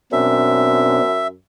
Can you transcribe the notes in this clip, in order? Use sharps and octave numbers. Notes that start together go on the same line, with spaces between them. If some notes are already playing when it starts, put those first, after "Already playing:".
F#2 B2 C4 D4 E5